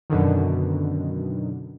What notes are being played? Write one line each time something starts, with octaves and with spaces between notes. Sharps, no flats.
F#2 B2 D3 D#3